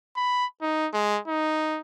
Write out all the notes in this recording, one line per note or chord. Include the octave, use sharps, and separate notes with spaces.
B5
D#4
G#3
D#4